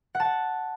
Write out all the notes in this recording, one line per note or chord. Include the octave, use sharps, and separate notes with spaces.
F#5
A5
F#5